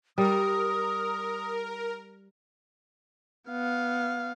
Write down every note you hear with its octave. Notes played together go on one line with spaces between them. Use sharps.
G3 A#4 D#6
B3 F5